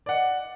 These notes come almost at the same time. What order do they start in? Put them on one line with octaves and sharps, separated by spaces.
D5 F#5 D#5